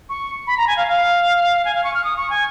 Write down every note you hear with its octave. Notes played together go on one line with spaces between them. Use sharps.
C#6
B5
A#5
G#5
F5
F5
G#5
F5
C#6
F6
D#6
C#6
G#5